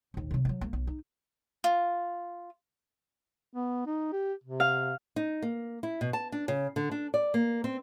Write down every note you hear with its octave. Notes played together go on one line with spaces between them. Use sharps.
A#1 D#2
C3 F#3
E3 F#3
C#2 A#3
B1
D#4
F4
B3
D#4
G4
C3
F5
D#4
A#3
E4
B2
A5
D4
C#3
D3
D4
D5
A#3
C4